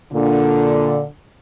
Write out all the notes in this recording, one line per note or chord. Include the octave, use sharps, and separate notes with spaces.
A#2 D3